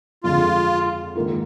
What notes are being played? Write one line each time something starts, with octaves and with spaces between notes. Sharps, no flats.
F2 D3 G#3 F4
G#2 D#3 A#3 F4